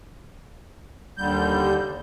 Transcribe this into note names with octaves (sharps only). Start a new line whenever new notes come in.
D#2 D3 G3 G6